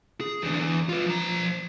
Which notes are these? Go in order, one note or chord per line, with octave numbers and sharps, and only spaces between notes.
G#4
E2 D3
E2
F4 B4
F3 A#5